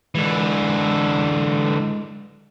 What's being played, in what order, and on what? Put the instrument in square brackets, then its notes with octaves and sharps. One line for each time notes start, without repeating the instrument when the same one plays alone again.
[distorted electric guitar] D3 E3 [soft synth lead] G#3